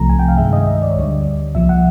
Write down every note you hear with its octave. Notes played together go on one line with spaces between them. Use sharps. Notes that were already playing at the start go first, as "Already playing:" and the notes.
Already playing: C2 C3 F3 A3 A#5
G#5
G5
F5
G2 D#3 G#3 E5
D#5
E5
D5
C#5
D2 D3 G3 D5
C2 A#2 F3 E5
F#5